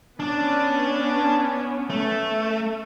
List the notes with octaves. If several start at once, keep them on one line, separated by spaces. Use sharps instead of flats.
B3 C#4 D4 D5
A3